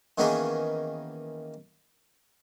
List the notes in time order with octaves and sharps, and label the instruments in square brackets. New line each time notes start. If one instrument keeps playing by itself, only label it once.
[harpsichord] D#3 E3 A#3 B3 C#4 G#4